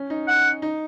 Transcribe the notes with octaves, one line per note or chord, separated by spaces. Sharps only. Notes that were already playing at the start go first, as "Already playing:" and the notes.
Already playing: C#4
D#4
F#5
D#4